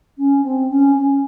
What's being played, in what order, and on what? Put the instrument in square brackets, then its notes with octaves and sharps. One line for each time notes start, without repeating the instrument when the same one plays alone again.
[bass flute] C#4
C4
C#4
C#4